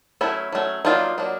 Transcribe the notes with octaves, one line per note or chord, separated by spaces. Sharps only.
F#3 A3 C#4 E4
F#3 A3 C#4
F#3 A#3 D4 D#4 F4
F#3 A#3 D4